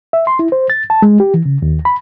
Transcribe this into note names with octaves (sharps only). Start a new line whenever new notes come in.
E5
C6
E4
C5
A6
A5
G#3
G4
E3
C#3
D#2
B5